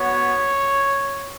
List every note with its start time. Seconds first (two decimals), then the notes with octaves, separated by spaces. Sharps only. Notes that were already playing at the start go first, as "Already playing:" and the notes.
Already playing: B3 F#4 C#5